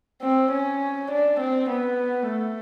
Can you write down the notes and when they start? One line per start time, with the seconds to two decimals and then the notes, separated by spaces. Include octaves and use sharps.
0.22 C4
0.51 C#4
1.11 D4
1.40 C4
1.69 B3
2.28 A3